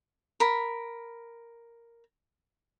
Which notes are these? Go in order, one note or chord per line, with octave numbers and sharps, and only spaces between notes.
A#4 B5